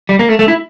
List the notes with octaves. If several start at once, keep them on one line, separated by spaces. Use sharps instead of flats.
G3
A#3
A3
A3
E4